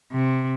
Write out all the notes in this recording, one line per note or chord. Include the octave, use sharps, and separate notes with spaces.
C3